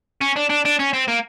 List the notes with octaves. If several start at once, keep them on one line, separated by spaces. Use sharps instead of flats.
C#4
D4
D4
D4
C#4
C4
A#3